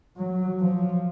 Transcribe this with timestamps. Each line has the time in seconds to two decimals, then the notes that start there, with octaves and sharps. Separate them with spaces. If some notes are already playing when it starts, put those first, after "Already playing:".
0.17 F#3
0.60 F3